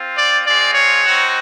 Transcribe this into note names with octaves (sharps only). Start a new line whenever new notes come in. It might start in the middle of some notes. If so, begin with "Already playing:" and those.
Already playing: C4 F4
D5
G#3 C4 F4 D5
C#5
C4 D#4 F#4